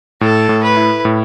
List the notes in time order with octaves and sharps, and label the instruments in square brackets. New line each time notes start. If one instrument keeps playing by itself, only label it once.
[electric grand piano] A2 [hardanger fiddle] A4
[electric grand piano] A2
[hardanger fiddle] B4
[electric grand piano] E4
A2